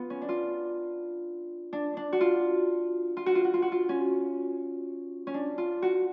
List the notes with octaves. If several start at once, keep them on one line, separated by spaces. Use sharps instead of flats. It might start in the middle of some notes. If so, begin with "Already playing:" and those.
Already playing: B3 F4
C#4
D4
F4
D4
D4
F#4
F4
F4
F#4
F4
F#4
F4
F#4
F4
C#4
C#4
D4
F4
F#4